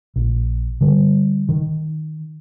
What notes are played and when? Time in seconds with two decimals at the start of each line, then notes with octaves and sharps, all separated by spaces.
0.16 A#1
0.81 D3 G3
1.49 D#3